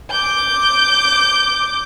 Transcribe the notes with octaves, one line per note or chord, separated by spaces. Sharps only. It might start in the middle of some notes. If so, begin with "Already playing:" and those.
D6 G6